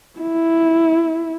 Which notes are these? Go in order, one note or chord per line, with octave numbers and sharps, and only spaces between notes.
E4